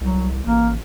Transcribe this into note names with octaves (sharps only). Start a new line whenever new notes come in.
C2 F#3
A1 A#3